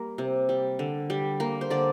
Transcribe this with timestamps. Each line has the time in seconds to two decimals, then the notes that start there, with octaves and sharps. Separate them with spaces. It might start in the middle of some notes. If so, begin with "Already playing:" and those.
Already playing: G3 A#3
0.18 C3
0.49 G3
0.79 D3
1.10 G3
1.40 A#3
1.61 C5
1.70 D3 D5